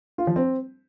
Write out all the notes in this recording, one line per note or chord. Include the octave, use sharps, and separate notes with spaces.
F4
F3
C4